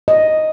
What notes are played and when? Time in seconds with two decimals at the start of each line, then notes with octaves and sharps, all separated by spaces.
0.08 D#5